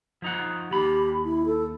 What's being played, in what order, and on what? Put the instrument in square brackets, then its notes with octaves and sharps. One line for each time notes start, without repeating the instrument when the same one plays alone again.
[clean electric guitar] F3 D#4 F#5
[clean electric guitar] D#2 B5 [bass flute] G4
[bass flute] E4
A4